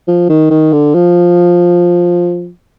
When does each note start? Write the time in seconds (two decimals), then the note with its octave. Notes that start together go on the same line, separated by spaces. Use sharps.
0.08 F3
0.30 D#3
0.51 D#3
0.73 D3
0.95 F3